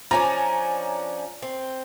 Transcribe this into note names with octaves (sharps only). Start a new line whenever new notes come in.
F3 C#4 D4 G#5 A#5
C4